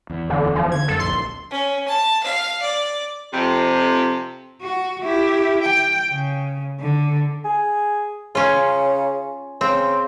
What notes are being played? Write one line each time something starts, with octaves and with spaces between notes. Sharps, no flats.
E2
D1 E2 D3
F3
D3 G#6
F1 F#2 A4
D1 A#1 C6
C#4
A5
F5
D5
F2 C3
F#4
E4 G4
G5
C#3
D3
G#4
C#3 C#4 F4
C#3 C4